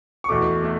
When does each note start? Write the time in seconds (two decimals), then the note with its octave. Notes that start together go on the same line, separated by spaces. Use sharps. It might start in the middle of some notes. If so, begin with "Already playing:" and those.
0.24 C#6
0.29 E2 B2 A3 D6
0.64 A3